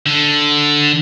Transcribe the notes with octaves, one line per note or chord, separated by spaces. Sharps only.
D3